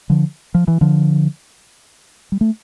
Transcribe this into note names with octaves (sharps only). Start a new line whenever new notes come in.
D3 F3
F3
E3
D3 F3
G3
A3